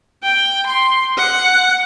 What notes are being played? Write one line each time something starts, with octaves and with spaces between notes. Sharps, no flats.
G5
C6
F#5